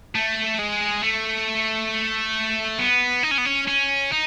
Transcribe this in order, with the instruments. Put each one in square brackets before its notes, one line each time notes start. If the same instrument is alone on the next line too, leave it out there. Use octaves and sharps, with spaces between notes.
[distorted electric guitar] A3
G#3
A3
B3
D#4
C#4
B3
C#4
C#4
D#4